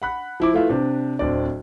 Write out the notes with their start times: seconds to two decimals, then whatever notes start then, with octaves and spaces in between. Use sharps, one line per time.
0.02 F#5 B5 F#6
0.40 F3 E4 D6
0.54 A3 E4 F4 B4 E5
0.69 C3 D4
1.19 D1 C4 D4 D5